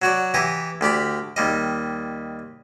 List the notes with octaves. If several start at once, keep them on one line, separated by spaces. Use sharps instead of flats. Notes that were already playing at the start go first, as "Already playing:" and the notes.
F#3 F#4 D5
E3 G4 A#5 D#6
D2 G4 D5 B5
D#2 G3 D#5